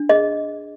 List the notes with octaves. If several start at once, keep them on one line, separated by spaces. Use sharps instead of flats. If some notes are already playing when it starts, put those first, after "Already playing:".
Already playing: D4
G#4 D#5